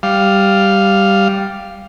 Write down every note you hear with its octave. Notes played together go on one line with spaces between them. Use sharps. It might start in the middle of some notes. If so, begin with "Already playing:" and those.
G3 F5